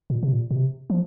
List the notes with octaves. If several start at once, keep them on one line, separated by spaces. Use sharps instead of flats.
A#2
C3
A#2
A#2
C3
F3